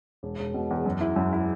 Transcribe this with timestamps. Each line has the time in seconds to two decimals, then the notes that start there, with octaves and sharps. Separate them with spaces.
0.23 E1
0.39 E1
0.54 B2
0.71 E2
0.86 F#2
1.01 E4
1.16 F#2
1.33 E4